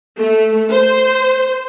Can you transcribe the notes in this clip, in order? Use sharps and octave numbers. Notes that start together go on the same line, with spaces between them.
A3
C5